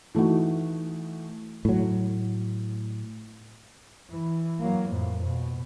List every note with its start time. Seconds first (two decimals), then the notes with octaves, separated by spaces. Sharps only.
0.15 E3 A3 D#4 F#4
1.65 A2 F#3
4.10 E3
4.60 F#3 A#3
4.91 F2 A2
5.24 B2